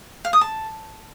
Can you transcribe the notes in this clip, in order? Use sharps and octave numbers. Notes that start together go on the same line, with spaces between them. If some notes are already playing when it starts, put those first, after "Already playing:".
F5
D#6
A5